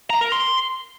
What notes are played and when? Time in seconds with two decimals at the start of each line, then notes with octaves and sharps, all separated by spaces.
0.10 A#5
0.21 A#4
0.32 C6